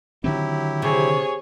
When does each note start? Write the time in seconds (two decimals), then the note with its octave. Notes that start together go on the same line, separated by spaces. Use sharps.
0.24 D3 D#3 F#3 C4 E4 G4
0.82 C3 G#4 C#5